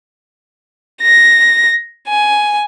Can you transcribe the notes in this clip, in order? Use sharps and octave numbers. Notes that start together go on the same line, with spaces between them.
A#6
G#5